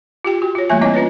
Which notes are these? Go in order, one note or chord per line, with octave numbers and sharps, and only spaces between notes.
F4 G4 G5
F#4
F4 C#5
E3 G3 A3 A#3 E5 G#5
A#3 C4 E4 C#5 D#5
C#4 F4 B4 C#5